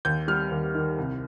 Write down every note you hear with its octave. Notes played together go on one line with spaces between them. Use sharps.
D#2 G6
G3 F6
D#2
D#3
C2